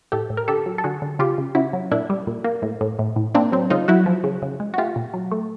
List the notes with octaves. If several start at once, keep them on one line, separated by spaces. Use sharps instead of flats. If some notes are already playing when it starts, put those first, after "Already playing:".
A2 G4 A4
A2
A#4
D3 G4 A4
F#3
A4
D3 F#4 G#4
D3
C#3 F4 G4
C#3
C#3 E4 F#4
F#3
A#2 D4 E4
G3
A#2
A#3
A2
A2
A2
A2
A#3 C4 D4
F#3 C4
C#3 D#4 F4
F#3 E4 F#4
F3
C#3
C#3
G#3
F#4
A3 F4 G4
A#2
F#3
A3